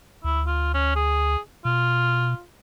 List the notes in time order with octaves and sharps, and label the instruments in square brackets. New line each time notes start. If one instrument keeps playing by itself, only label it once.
[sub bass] D2 [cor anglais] E4
[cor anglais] F4
C#4
G#4
[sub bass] B2 [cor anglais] F4